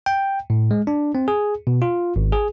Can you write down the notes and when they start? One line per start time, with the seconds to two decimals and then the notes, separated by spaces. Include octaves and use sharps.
0.06 G5
0.50 A2
0.71 G#3
0.87 D4
1.15 C4
1.28 G#4
1.67 B2
1.82 F4
2.16 G#1
2.32 G#4